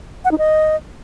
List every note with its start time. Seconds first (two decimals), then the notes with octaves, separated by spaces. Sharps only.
0.25 F#5
0.31 D#4
0.38 D#5